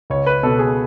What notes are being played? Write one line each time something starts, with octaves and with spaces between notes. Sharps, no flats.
C#2 C#5
B4
B2 A4
G#4